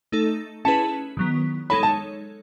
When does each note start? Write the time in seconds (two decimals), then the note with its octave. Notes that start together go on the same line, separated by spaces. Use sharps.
0.12 A3 D#4 A4
0.65 C#4 E4 G#4 B4 A5
1.17 D#3 F#3 B3
1.70 G#3 D#4 A4 C#5 B5
1.83 A5